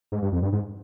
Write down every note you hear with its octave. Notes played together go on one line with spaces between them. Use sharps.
G#2
G2
F2
G2
G#2